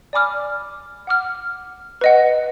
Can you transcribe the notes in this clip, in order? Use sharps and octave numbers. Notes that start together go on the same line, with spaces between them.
D5 G#5 B5 D6 F6
F#5 D6 F6
B4 D#5 F#5